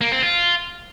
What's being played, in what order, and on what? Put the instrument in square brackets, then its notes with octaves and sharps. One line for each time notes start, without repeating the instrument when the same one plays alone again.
[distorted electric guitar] A#3
C4
F4